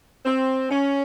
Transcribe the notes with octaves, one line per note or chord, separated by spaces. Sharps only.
C4
C#4